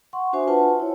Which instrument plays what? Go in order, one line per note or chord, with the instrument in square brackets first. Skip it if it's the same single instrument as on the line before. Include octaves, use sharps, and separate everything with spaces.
[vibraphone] F#5 C6 C#6
D4 F#4 C5 E5 G#5
F4 B4 F#5 A5
E4 C#5